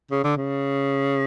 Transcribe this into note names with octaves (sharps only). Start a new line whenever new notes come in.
C#3
D3
C#3